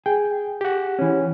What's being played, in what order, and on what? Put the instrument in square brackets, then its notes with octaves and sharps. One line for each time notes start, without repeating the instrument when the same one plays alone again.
[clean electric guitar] G#4 [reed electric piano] G5
[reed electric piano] G4 F#5
[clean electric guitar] E3 C#4